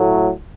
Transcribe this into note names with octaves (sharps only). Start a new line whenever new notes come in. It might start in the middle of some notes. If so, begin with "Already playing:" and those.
Already playing: A2 F#3 A3